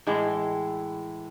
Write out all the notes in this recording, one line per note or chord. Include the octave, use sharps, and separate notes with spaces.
A2 E3 G#3